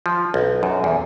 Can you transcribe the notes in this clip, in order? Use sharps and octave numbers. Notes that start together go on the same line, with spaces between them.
F3
B1
F#2
E2